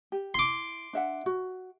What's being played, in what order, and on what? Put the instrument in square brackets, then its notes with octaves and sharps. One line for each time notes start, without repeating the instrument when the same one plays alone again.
[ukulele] G4
[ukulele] E4 [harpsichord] C6 D6
[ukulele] D4 E5 F#5
F#4